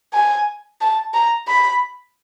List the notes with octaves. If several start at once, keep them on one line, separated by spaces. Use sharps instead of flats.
G#5
A5
A#5
B5